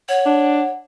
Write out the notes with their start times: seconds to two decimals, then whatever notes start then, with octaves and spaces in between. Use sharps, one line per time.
0.09 C#5 F#5
0.26 D4